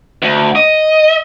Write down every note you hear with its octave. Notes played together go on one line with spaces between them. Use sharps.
D2
D#5